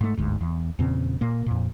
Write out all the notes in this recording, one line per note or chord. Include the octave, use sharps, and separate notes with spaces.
G#2 A3
G1 D2 G#2
E2
E2 A#2 C#3 C4
A#2 A#3
F2 A#2